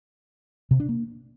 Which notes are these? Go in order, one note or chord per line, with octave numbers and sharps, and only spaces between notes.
C3
D4
A#3